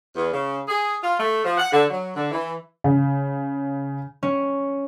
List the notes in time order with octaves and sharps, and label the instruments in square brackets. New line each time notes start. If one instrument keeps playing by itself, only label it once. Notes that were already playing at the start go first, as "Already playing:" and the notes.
[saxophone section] E2
C#3
G#4
F4
A3
F3
F#5
D3
F#3
D3
E3
[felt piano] C#3
[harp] C#4